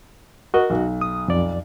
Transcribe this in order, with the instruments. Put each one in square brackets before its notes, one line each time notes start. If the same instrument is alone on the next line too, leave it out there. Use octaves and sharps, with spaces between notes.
[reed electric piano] F#4 D#5 [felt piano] A#4
[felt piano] B1
[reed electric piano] D#6
F2 D5